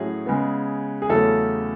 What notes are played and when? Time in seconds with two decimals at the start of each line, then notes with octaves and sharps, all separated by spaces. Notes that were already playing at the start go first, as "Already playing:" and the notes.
Already playing: A2 F#3 A3 C#4 G#4
0.26 C#3 G#3 B3
1.02 G#4
1.09 E2 C#3 F#3 A3 C#4 A4